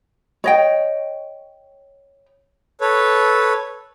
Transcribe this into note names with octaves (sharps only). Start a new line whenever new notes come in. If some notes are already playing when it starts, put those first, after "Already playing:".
C#5 D#5 G5
A4 B4 C#5